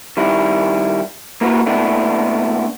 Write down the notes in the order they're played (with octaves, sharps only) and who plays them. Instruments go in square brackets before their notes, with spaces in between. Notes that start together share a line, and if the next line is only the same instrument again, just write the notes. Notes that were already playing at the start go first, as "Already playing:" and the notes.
[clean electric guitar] D#3 G3 E4
A#3 E4 F#4 B4
A#2 A3 B3 D4 E4